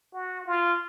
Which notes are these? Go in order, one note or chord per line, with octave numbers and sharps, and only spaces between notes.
F#4
F4